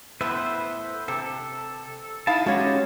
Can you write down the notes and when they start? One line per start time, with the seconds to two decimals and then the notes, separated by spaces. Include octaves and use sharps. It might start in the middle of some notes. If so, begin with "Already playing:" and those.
0.21 A2 B3 B4 C5 E5
1.08 C3 A4
2.27 D#4 E4 F5 A5
2.46 G#3 C#4 F#4 G4 C#5